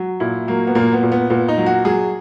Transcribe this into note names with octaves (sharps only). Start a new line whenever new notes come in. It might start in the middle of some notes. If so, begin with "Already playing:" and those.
Already playing: F#3
A#2 E4
F#3 A#3
B3
A#2 A#3
B3
A#2
B3
A#2 B3
D#4
F#3
F#4
F#3 G#4